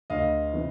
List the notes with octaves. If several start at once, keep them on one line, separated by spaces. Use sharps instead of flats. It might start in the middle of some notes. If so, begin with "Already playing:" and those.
D2 D#5 F5
C3 E3